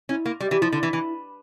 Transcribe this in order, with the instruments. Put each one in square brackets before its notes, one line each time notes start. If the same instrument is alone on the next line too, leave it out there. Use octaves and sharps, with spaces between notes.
[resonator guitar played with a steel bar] C#4 [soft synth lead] E4
[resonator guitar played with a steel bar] A#3
[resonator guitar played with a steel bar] G3 [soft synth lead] G4
[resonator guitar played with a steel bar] E3 [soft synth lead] G4
[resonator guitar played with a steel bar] F3 [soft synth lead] E4
[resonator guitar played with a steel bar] D3
E3
E3